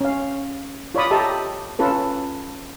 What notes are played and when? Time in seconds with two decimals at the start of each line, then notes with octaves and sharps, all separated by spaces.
0.01 C#4 F5
0.95 F4 C#5 D5 B5 D#6
1.11 G4 A4 D#5 E5 A5 A#5
1.79 C#4 F4 A4 B4